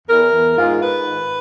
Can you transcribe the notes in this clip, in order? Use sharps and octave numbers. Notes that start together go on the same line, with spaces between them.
E2 A#4
E2
G#2 F4
G#2 B4
D#3